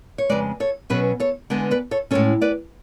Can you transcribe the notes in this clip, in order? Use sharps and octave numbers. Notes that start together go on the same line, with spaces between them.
C#5
F2 C#3 G#3 B4 D5
A4 C#5
B2 F#3 C#4 G#4 B4
A4 C#5
D3 G#3 B3
B4 D5
A4 C#5
A2 G#3 C#4 A4 C#5
B4 D5